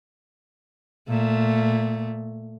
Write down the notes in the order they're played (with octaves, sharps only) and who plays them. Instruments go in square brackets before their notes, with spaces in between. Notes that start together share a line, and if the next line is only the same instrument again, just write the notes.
[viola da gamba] A#2 A3